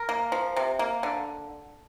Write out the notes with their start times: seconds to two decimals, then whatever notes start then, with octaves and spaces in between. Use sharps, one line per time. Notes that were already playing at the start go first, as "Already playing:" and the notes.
Already playing: A#4
0.09 A#3
0.32 F3
0.56 C3
0.79 A#3
1.03 D3